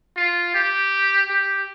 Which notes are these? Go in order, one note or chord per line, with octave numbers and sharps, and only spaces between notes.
F4
G4
G4